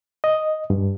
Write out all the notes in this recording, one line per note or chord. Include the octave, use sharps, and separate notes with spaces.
D#5
G2